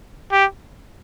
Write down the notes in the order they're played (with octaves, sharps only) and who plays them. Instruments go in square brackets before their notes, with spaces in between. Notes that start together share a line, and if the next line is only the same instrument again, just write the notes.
[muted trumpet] G4